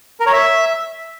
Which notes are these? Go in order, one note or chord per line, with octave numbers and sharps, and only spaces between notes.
A#4
C#5
E5